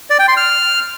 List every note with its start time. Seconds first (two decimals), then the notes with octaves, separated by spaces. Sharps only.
0.10 D5
0.19 G5
0.28 C6
0.37 F6